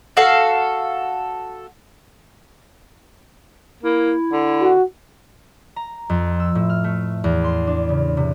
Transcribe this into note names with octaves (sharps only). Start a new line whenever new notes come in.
F#4 A4 F5
A#3 E4
D3
F#4
A#5
F2
E6
A2
F6
A3
E2
C6
D4
C#3
C3